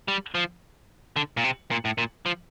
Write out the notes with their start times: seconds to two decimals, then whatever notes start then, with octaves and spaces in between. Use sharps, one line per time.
0.08 G3
0.35 F3
1.16 D3
1.37 A#2
1.44 C3
1.71 A#2
1.85 A2
1.98 A#2
2.26 F3